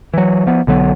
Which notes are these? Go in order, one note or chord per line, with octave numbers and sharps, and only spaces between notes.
E3 F#3
F3 B3
B1 D3 F#3 B3